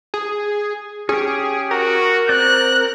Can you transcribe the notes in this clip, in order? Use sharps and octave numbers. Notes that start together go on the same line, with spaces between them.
G#4
C#4 G4 G#4
F#4 A#4
C4 D5 F#6